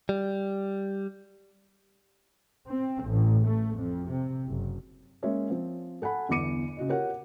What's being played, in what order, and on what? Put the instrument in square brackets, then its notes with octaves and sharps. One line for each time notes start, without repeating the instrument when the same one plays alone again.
[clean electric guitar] G3
[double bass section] C4
A1
A3
F2
C3
F#1
[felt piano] G#3 A#3 C#4 C#5 E5
F3 C4
A4 F#5 G#5 B5
G1 E2 B3 D6 C#7 D#7
C#3 F#4 D#5
F4 G4 A#4 C#5 F#5